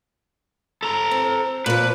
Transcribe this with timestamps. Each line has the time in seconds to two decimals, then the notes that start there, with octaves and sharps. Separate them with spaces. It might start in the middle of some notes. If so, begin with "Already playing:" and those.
0.83 A4 A#5
1.11 C4
1.66 A#2 F3 B4